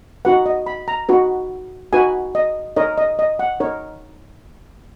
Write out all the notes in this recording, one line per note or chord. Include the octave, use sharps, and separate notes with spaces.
D#4 F#4 B4 F#5
D#5
B5
A#5
D#4 F#4 B4
D#4 F#4 B4 G#5
D#5
D#4 A#4 C#5 D#5
D#5
D#5
F#5
D#4 A#4 C#5